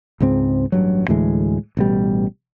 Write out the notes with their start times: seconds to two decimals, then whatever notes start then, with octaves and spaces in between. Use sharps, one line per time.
0.20 C#2 G#2 C4
0.72 A1 G2 F#3
1.08 D2 A2 E3 G#3
1.77 A1 B2 G3